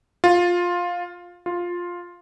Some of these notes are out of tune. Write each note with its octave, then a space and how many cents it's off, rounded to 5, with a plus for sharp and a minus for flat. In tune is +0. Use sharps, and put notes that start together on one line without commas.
F4 +15
F4 +10